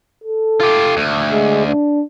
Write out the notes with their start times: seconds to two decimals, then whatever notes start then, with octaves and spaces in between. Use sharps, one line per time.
0.24 A4
0.60 F4 G4
0.97 D2
1.32 G#3
1.66 D4